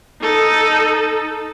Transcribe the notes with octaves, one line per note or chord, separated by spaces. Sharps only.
D#4 A4